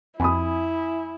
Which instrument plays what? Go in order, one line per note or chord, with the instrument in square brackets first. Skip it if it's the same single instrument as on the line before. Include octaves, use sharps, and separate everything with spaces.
[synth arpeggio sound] F2 [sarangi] E4 [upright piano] G#5 B5 D#6